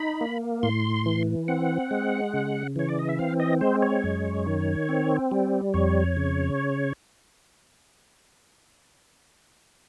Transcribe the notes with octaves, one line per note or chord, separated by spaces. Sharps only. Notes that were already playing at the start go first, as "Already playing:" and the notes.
Already playing: D#4 B5
A#3
A2 C6
E3
C4 F#5
G#3
C#3
E3 C#5
D5
D#5
E5
C4 F5
D#5
G#3 C5
C#5
F#2
D#3
C4
G3
F2 C#5
C#3